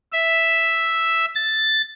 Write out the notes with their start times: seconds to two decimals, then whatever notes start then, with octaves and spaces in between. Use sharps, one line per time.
0.13 E5
1.36 A6